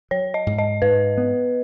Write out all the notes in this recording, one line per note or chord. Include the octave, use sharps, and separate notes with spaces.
F#3 C#5
D#5
G#2
D#5
G#2 B4
B3